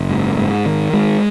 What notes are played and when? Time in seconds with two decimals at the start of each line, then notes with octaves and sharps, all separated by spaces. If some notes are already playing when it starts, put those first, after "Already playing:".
Already playing: F#1
0.10 G#2
0.37 G#2
0.66 D#3
0.93 G#3